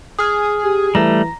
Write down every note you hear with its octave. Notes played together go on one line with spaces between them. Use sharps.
G#4 D#6 F6
G4
E3 G3 A3 A#5 A#6